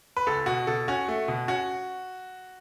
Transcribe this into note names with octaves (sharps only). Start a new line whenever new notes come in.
B4
C#2 A4
B2 F#4
B2 A4
C#4 F#4
A3
B2
C#4 F#4